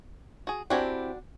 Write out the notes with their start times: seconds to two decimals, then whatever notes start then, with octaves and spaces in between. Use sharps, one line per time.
0.47 F#4 G#4
0.70 C4 D4 E4 F#4 G4 G#5